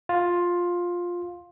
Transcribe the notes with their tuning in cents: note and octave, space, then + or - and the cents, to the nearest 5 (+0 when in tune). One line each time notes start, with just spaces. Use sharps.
F4 +10